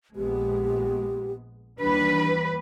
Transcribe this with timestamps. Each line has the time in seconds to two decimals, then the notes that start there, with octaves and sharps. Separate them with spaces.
0.16 A#1 G#3 B3 G4
1.80 D#2 E3 G3 D4 B4